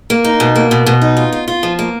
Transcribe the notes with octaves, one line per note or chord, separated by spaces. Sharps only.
A#3
D#4
B2
A#3
B2
B2
D#4
F4
F4
F4
F3
A#3